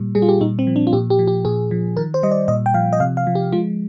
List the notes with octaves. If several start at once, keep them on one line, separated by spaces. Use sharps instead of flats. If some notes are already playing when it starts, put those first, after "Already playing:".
Already playing: A#2 G3
G3 G#4
F4
G4
A#2 D#4
C4
F3
D4
F4
A#2 G4
G4
F3
G4
A#2 G#4
F3
D#3 A#4
C5
G3 D#5
D5
A#2 D#5
G5
F3 F5
D#5
C3 F5
F5
F3
G4
G#3 F4